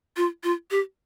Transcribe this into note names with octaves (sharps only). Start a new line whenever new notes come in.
F4
F4
G4